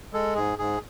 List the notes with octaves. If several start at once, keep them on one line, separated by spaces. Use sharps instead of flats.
G#3 A4
G#2 G#4
G#2 G#4